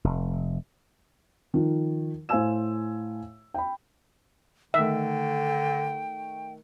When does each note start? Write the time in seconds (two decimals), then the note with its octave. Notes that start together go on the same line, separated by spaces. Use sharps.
0.04 F1
1.54 D#3 F3
2.29 A2 C5 F5 G#5 E6 E7
3.54 G5 B5
4.74 D3 D#3 A3 E5 G5